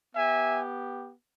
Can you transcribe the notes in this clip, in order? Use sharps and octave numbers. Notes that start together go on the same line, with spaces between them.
B3 G4 E5 G#5